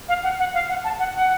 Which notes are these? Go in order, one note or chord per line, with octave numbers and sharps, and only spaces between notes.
F5
F#5
F#5
F5
F#5
A5
F#5
F#5